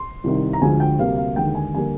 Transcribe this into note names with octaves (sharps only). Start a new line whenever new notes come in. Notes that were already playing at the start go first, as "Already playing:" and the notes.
Already playing: C6
C2 C3 D#3
A#5
D2 D3 F3 G#3 G#5
G5
D2 C3 G3 A#3 F5
F5
D#2 D3 G#3 G5
G5
G#5
D3 G3 A#3 G#5